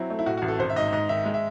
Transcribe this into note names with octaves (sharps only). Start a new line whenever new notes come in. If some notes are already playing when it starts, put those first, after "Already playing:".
Already playing: F#3 C4 E4
A3
E4
A2 F#4
F#4
A1
A4
G#1 C5
E5
G#2 D#5
G#2 D#5
D#3 E5
G#3
E5